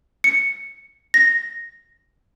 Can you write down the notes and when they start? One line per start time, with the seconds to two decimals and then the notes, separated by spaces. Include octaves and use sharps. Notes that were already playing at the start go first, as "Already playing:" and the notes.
0.24 C#7
1.14 A#6